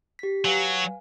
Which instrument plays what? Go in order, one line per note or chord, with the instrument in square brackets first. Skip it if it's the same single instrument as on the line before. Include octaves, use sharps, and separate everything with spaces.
[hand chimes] G4 B6
[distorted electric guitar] F#3 [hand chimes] B4 F5 G#5